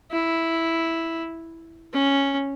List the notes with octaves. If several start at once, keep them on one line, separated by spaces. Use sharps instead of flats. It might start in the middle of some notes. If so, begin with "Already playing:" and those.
E4
C#4